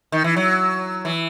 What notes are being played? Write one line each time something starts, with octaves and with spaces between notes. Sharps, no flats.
D#3
E3
F#3
E3